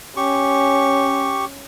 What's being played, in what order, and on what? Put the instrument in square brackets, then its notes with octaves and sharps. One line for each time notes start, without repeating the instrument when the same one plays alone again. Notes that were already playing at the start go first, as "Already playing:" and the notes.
[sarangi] C#4 [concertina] G4 C#6